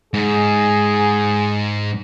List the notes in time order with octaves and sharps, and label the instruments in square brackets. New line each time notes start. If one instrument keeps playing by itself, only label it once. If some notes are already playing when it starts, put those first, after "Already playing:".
[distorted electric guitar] G#2 [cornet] G#4